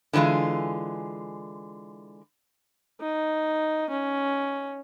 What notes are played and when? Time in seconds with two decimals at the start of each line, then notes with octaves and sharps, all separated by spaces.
0.13 D3 E3 F#3 G#3 F4
3.01 D#4
3.90 C#4